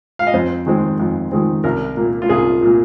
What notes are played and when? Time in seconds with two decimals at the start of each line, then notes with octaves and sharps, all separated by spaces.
0.19 F5
0.27 D#5
0.33 F2 C5
0.66 D#3 G#3 C4
0.99 F2
1.32 D#3 G#3 C4
1.64 C2 A#4
1.97 A#2 A#3
2.22 F4
2.29 C2 G#4
2.62 A#2 A#3